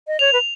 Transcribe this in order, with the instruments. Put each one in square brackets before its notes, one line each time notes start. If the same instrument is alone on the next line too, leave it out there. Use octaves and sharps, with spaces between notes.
[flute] D#5
[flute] C#5 [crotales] F7
[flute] B4